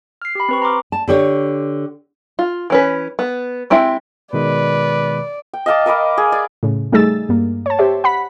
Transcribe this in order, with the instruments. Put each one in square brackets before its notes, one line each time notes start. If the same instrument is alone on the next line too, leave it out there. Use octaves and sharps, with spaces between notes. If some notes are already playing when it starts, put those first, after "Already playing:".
[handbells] F6 C7
G4 B5
C4 B4 C#6
A#5 C6 D6 F6
[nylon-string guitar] A5
D3 G4 C#5
[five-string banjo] F4
E3 C#4 B4
B3
G#3 C4 E4 G4 E5
[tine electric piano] B2 D#3 G#3 [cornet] B4 [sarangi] D5
[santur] G5
D#5 F5 A5 D6
A#4 D#5 B5 D6
G#4
D5
[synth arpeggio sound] A2 C#3
G3 A3 D#4 G#4 E6 A6
G2 A#3
C#5 A5
G4 C5 C#5 E5
F#5 B5 B6